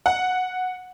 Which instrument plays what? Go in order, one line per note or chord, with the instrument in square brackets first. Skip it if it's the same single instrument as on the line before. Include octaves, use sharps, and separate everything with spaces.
[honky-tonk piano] F#5